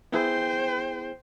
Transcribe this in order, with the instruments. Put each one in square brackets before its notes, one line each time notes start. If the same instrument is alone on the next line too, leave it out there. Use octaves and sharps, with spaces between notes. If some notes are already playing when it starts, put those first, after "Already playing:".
[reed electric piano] B3 E4 G#4 [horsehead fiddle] C5 G5